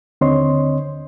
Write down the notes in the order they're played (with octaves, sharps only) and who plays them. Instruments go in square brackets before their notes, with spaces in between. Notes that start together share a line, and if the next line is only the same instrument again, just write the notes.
[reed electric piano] D#2 D3 C4 C#5 D#5 C6